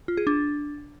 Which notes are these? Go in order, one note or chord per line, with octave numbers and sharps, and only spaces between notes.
F4
G#4
D4